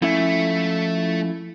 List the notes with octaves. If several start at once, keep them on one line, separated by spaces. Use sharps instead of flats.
F3 A3 C#4 E4 E5